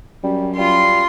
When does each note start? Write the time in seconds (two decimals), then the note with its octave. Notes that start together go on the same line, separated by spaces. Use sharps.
0.23 F#2 G3
0.57 G3 F4 C6